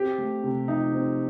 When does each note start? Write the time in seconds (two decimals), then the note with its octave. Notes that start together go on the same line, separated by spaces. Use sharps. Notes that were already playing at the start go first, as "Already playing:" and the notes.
Already playing: C4 G4
0.18 A3
0.44 C3
0.68 F3 D#4
0.94 C4